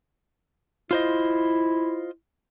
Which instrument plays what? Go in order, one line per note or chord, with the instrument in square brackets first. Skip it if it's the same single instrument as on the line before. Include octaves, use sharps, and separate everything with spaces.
[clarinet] E4 [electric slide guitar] F4 C5 D#5